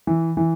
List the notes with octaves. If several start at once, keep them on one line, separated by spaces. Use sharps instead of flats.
E3
E3